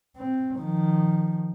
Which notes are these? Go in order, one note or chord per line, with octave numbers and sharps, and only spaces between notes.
C4
D#3 F3